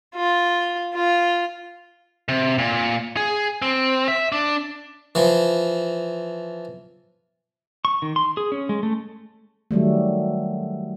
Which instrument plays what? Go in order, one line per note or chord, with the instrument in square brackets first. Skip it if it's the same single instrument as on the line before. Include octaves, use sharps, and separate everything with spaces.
[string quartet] F4
F4
[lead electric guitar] C3
A#2
G#4
C4
E5
D4
[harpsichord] E3 F3
[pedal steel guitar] C#6
D#3
C6
G#4
C#4
G#3
A3
[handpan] D#3 F#3 G3 A3